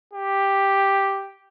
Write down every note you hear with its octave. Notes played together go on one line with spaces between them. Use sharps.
G4